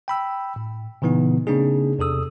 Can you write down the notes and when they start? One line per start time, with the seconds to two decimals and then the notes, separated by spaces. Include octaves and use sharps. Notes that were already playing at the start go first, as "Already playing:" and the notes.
0.08 G5 B5 E6
0.56 A2
1.02 A#2 C#3 E3 B3 D#4
1.47 C#3 A#3 C4 D4 D#4 G#4
1.99 E2 C3 A4 D#6 E6